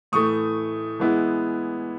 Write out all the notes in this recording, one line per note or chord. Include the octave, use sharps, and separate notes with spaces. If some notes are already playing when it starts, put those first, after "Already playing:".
A2 E3 A3 C#6 D#6
E3 G#3 B3 E4